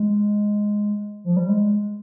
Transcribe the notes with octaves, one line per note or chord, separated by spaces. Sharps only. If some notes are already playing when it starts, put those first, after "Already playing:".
Already playing: G#3
F3
G3
G#3